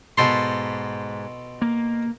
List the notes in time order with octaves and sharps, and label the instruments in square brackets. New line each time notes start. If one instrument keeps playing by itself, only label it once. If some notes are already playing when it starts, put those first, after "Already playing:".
[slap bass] G#2 [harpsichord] B2 A4 C6
[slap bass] A#3